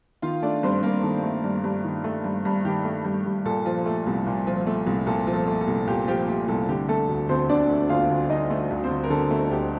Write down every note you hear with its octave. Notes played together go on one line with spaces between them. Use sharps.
D#3 F4 F5
A3 D4 D5
G2 C4 C5
G2 A#3 A#4
D#3 A4
A3
G2
G2
D#3
A3
G2
G2
D#3 G4
A3
G2
G2
A#2 A4
F3
A3
C2
A#2
F3
A3
C2
A#2 A4
F3
A4
A3
A4
C2
A#2 G4
F3 G4
A3 G4
C2 A4
D3 G4
A3 A4
D2
D2 C4 C5
D3 D4 D5
A3
D2 F4 F5
D2
D3 D#4 D#5
A3
D2
C4 C5
D2
A#4
D3 A4
A3
D2 G4